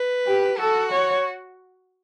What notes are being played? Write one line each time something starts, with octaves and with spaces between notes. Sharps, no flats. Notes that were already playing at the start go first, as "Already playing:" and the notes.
Already playing: B4
G4
F#4 A4
C#5